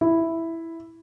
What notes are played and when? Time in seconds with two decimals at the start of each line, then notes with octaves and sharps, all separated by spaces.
0.01 E4